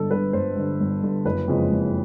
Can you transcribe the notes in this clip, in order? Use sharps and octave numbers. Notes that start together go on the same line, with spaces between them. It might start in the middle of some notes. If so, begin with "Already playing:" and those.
Already playing: G1 G2 D3 A4
G2 D3 B4
G1 C5
G2 D3
G1
G2 D3
F#1 B4
F2 C#3 F3 G#3
F#1